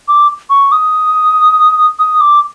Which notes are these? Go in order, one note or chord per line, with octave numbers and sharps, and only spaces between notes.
D6
C#6
D#6
D#6
D6